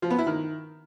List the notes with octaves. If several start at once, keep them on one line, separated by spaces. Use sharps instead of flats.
F3
B3
E4
D#3